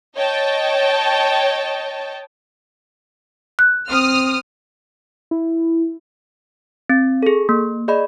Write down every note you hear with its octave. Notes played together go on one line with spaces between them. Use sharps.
C#5 D#5 G5 A5
F#6
C4 D#6 F6
E4
C4
G#4 A4
A#3
G#4 D5 D#5 B5